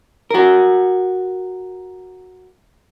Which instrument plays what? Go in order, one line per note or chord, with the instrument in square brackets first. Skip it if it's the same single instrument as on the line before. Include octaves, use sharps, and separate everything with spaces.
[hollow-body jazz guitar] F#4 A#4